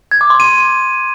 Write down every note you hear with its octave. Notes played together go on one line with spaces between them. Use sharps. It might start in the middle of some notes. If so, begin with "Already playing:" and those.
G#6
D6
C6
D#7